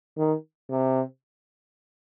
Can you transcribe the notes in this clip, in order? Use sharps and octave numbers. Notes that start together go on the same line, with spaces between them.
D#3
C3